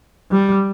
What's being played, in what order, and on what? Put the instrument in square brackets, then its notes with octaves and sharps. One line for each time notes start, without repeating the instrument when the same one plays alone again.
[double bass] G3